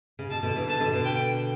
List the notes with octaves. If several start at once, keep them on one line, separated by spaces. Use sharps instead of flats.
C#3
B2 A5
B2 D3
C#3 E3
B2 D3 A5
B2 D3
B2 D3
G5